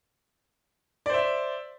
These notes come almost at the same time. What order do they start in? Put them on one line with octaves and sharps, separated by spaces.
D5 C5 E5